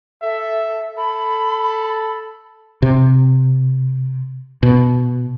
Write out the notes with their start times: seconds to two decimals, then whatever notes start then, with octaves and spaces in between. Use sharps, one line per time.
0.22 A4 E5
0.97 A4 B5
2.82 C3
4.63 B2